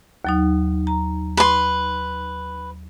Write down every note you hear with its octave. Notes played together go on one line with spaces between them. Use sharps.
D#2 F#3 D#4
A#5
B4 C6